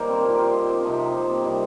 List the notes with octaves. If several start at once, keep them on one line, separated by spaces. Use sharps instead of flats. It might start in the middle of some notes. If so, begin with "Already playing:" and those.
Already playing: D#3 G3 A#3 A#4 C5
C4
A#2 F3
F4 G4
D#4
C4
C3 F3 D#4
G4
F4
C4
A#3
C3 D#3 G3 C4